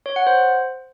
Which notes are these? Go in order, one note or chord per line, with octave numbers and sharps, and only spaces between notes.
C#5
F#5
C5